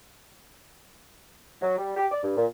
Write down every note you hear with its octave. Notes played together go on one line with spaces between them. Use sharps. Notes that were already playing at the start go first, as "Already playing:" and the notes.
F#3
G3
G4
D5
G2
A#2